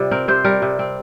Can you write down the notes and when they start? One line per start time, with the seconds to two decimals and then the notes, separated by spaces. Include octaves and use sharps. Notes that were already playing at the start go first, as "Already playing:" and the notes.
Already playing: C3 G3 F4
0.11 C4 A#4
0.28 C3 C5
0.44 G3 A#4
0.62 C3
0.79 C4